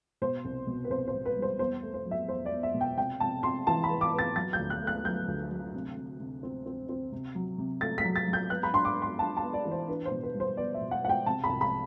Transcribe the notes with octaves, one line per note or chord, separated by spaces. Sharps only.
B2 C5
C2
B2
B4
C2 C5
C5
B2
B4
G3
C5
E2 C5
A3
C5
F#3
E5
E2 C5
D5
E2
E5
B2
G5
C3 G5
C3 A5
C3 C6
E3 A5
B5
B3
D6
B3
A6
F#3 A6
G6
D2
F#6
A3
F#6
F#3 G6
D2
F#3
C3
C3
C3
C4
C4
C4
C3
F#3
C3
A3 A6
B6
F#3
A6
F#3
G6
B3 F#6
B5
D4 C6
D6
B3
C6
D4 A5
A5
B3
D5
E3
C5
D4 B4
C5
B2
B4
G3
C5
B3 D5
E5
B2
F#5
B3 F#5
G5
C3 A5
B5
C2
B5